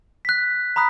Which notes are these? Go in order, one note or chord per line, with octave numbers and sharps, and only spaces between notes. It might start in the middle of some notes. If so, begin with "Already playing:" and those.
F#6 B6
A#5 B5 D#6 F#6 B6